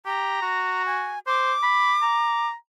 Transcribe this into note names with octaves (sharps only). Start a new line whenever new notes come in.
G4 A#5
F#4
G#5
C5 D6
B5
A#5